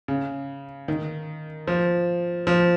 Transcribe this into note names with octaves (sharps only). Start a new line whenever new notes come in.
C#3
D#3
F3
F3